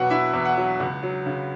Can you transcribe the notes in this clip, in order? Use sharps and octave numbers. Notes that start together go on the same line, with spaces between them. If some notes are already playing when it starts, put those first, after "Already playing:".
Already playing: E2 B2 F#3 B4 F#5
E4 E5
E2
F#5
F#3
C#2
F#3
C#3